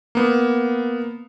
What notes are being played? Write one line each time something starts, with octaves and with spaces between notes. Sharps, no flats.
A#3 B3